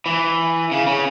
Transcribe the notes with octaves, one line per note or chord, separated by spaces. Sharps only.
E3
C#3
C#3